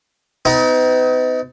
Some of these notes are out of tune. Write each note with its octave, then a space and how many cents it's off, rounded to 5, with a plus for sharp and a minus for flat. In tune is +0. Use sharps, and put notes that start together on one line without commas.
B3 +45 D#4 +25